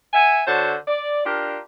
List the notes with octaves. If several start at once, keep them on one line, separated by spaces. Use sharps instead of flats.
E5 F#5 G#5
D3 F#4 C5 C#5 A5
D5
D4 F4 G4 A#4